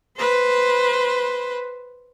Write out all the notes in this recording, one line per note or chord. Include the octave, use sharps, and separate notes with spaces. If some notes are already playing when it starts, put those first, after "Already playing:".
B4 C5